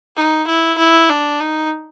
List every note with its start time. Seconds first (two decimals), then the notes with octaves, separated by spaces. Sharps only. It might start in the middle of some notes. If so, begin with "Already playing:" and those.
0.16 D#4
0.47 E4
0.78 E4
1.09 D4
1.40 D#4